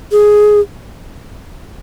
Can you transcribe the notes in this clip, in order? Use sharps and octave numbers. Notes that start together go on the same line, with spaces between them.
G#4